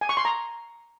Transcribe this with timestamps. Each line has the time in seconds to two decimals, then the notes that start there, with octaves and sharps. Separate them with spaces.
0.01 G#5
0.09 C#6
0.17 C6
0.25 A#5